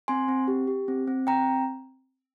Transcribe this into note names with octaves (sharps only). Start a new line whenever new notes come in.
C4 G#5 C6
C4
G4
G4
C4
C4
C4 G5 A#5